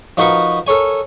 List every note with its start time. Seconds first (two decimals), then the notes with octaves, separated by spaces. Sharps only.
0.17 F3 D#4 F#4 A#4 B4 C#6
0.67 A4 A#4 C#5 G#5